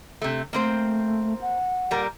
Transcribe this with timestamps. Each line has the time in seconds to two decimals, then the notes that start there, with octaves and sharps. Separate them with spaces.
0.22 C3 A3
0.53 A3 A#3 C4 C5
1.41 F#5
1.91 A#2 G3 A#4